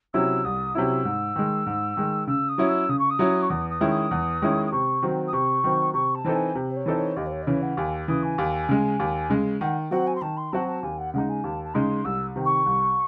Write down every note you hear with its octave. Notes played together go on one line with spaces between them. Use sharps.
C3 F#3 C#4 E4 E6
C2 D#6
C3 F#3 C#4 E4 E6
G#2
D#3 G#3
G#2
D#3 G#3
C#3 E6
D#6
F#3 C#4 E4
E6
C#3 D#6
C#6
D#6
F#3 C#4 E4
C#6
E2 D#6
D#6
D#3 G#3 C#4 E4
D#6
E2
D#3 G#3 C#4 E4
D#6
C3 C#6
D#3 F#3 C4
D#6
C3 C#6
D#3 F#3 C4
C3 C#6
A5
E3 C4 D#4 A4
G#5
C3
C5
C#5
E3 C4 D#4 A4
C#5
D#2 D#5
C5
C#5
D#5
C#3 E3 C#5
F#5
D#2 G#5
C#3 E3 D#6
G#5
D#2
C#3 G#3
D#2
C#3 G#3
D#3 F#5
F#3 C4 F#4 F#5
G#5
C6
D#3 A5
C6
F#3 C4 F#4 A5
A5
D#2 G#5
F#5
C#3 G#3 D#4 F#5
G#5
D#2 A5
A5
C#3 G#3 D#4 C6
C2 E6
C3 D#3
C#6
C2